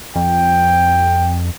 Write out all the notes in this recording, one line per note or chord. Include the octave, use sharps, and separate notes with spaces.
F2 G5